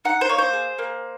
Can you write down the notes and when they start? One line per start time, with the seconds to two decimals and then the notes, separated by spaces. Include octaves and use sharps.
0.05 D#4 F#5
0.21 C5
0.29 A#3 C#5
0.38 C5
0.53 G#4
0.79 A#3